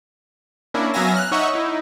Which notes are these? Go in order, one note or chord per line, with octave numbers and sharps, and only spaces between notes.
A#3 C#4 D4 E4
F#3 B3 E5 F5 G#5 A#6
F6 F#6
D#4 C#5 D#5 E5 F#5 C#6
D#4 E4